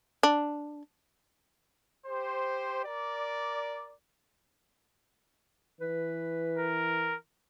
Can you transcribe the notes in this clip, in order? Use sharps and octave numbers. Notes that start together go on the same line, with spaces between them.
D4
G4 C5
A#4 D5
E3 B4
A#4